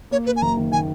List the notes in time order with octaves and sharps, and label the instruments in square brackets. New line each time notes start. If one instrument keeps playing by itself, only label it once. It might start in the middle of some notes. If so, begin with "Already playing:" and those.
[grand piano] A#3 [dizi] C#5
[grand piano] A#3 [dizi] B4
[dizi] G#5
[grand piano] F#1 [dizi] A#5
[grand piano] D#3
[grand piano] D#3 [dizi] G#5